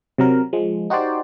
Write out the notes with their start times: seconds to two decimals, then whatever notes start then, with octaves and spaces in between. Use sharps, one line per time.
0.18 C3 F#3 A#4
0.53 F3 G#3
0.90 D#4 F#4 G4 C5 D5